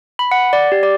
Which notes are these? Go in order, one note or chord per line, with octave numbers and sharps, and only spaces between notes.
B5
F#5
D5
G4
D5